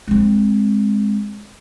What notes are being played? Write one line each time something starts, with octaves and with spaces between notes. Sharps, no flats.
G#3 C4